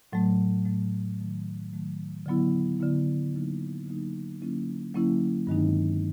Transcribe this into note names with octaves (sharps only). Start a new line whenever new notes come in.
A2 F#3 A3
A2 F#3 A3
D#3 F#3 A3
D#3 F#3 A3
D3 F#3 B3 E4
D3 F#3 B3 E4
D3 F#3 A#3 D#4
D3 F#3 A#3 D#4
D3 F#3 A#3 C#4 E4
D3 F#3 A#3 C#4 E4
G2 D#3 G#3 C4 D#4